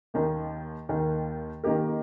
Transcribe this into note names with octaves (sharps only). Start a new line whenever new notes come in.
D#2 D#3 A#3
D#2 D#3 A#3
D#3 A#3 D#4 G4 A#4